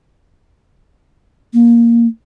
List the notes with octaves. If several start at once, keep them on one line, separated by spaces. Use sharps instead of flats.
A#3